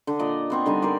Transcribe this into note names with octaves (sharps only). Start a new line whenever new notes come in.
D3
A#2 D5 D#5 A#5
B3 C4 C#6
D3 G3 D#4 G#5
A#4 C5 D5 C#6